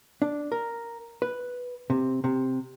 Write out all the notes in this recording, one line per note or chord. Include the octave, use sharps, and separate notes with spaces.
D4
A#4
B4
C3
C3